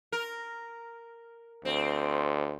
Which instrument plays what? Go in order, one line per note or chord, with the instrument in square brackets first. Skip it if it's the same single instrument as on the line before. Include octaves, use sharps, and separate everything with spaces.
[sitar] A#4
[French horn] D2 [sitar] C4